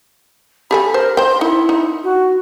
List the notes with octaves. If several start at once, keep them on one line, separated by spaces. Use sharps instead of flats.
G4 A4 G#5 B5
A#4 C5
C5 G5 C6
D#4 E4
D#4
F#4